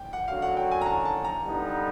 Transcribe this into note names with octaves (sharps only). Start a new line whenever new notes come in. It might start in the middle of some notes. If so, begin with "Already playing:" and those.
Already playing: G5
F#5
F#2 D3 F#3 F5
F#5
G5
G#5
A#5
A5
A5
A#5
D3 G3 B3 D#4